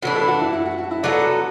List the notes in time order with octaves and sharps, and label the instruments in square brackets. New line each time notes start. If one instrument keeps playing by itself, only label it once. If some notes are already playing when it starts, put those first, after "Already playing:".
[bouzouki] A2 E3 D4 [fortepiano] F#4
[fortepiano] A4
F#4
E4
E4
F#4
F#4
E4
[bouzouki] F#3 B3 F#4 A4 [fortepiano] D5